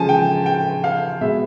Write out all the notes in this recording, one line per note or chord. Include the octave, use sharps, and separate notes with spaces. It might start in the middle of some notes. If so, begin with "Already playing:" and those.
Already playing: C#3 F3 G#3 C#4 G#5 A5
G5
G5
F5
B2 G#3 B3 E5